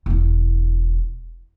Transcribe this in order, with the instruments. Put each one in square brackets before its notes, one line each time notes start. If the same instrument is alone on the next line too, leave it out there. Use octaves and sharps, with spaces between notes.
[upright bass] E1 E4